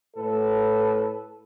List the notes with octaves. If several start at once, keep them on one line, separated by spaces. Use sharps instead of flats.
A2 A4 B4